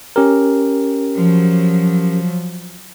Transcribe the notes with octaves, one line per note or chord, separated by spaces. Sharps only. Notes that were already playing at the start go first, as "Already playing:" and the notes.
C#4 G4 A#4
F3 F#3